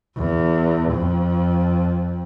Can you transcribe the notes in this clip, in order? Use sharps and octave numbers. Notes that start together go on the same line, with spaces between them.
E2
F2